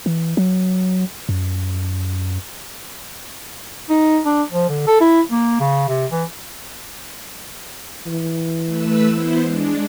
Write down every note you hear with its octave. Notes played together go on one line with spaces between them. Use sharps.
E3
F#3
F#2
D#4
D4
F3
D3
A4
E4
A#3
C#3
C3
E3
E3
A3 B4 E6
B3 E4 C5
G#3 D4